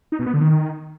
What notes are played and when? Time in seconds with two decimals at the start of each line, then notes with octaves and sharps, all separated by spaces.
0.12 D#4
0.19 B2
0.26 B3
0.34 D3
0.41 D#3